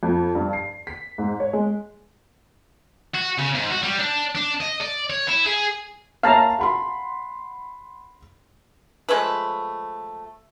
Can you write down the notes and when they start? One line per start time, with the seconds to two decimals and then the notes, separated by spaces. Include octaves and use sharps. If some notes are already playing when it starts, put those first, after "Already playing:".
0.03 F2
0.35 G2
0.53 C7
0.87 B6
1.18 G#2
1.40 C#5
1.53 G#3
3.15 F#4
3.39 C#3
3.55 G#2
3.71 F#4
3.83 G3
3.99 D4
4.35 D4
4.60 D#5
4.81 D5
5.10 C#5
5.28 E4
5.46 G#4
6.23 A#3 C#5 E5 F5 A5 A#5
6.59 F#5 B5 C6
9.09 F3 G#3 A3 B4